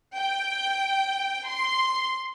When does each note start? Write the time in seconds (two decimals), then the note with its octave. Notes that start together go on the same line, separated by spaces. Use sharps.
0.15 G5
1.49 C6